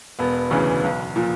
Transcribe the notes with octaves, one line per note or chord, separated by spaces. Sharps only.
E1 B3
D2 C#3 E3
B1
A#2 F3